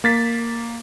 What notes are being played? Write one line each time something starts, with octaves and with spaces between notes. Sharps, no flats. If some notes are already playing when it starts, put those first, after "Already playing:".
A#3 A6 B6